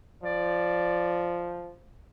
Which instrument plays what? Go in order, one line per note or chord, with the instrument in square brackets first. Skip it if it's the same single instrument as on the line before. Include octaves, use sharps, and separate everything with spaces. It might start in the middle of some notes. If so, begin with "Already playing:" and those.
[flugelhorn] F3 [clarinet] D5